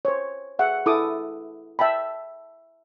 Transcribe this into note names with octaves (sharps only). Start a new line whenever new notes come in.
C5 C#5
G#4 E5 F#5
E4 A4 D6 D#6
E5 G5 A5 B5